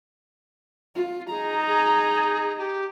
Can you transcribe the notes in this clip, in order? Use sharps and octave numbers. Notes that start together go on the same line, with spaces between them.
F4
D#4 G#4 A#5
G#4
G4